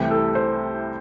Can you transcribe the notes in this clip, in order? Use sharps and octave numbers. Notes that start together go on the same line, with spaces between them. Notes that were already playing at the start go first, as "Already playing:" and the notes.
Already playing: C2 C3 E3 A3 G4
A4
C5